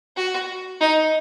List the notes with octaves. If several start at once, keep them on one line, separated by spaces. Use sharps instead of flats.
F#4
D#4